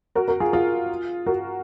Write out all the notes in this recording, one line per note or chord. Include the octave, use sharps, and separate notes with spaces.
F#4 A#4
F#4 A#4
F4 G#4
F4 G#4
F#4 A#4